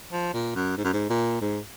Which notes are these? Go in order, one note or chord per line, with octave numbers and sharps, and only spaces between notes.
F3
A#2
F#2
G#2
F#2
G#2
A#2
G#2